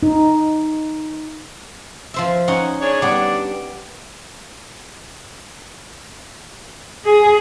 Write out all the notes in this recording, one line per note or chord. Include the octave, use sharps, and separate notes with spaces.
D#4
F3 C5 E5
C#4 D#4 F#5
D4 G#4 C#5
G3 B3 D4 D6
G#4